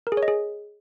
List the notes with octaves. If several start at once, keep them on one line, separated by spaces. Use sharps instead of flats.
A#4
G#4
C#5
D#5
G#4